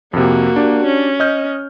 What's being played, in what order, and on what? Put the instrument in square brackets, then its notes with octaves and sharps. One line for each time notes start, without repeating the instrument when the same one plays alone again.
[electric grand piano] F2 C3 [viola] A#3 F#4
[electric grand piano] D4 G4 D5
[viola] C#4
[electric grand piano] D#5 F6 G6